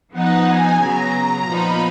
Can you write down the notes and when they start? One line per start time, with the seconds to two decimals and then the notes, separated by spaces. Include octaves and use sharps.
0.12 F3 B3 D#4 F#5
0.47 G#5
0.81 C#3 F#3 B3 A#5
1.49 A#2 F3 B3 D#4 B5